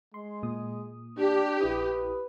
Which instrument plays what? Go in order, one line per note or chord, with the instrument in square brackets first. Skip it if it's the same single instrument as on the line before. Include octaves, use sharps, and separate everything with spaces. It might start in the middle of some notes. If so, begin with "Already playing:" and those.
[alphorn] G#3 [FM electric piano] C6
[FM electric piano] A#2 D#6
[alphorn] D4 [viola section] G4
[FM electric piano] A#1 E4 D#6 [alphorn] B4